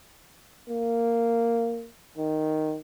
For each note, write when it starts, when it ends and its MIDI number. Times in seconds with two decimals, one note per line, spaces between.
0.69 1.89 58
2.17 2.77 51